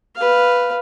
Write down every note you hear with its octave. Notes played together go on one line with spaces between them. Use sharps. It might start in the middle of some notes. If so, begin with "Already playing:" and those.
B4 F5